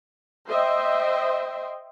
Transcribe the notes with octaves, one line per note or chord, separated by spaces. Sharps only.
C5 D#5 E5 G5 C6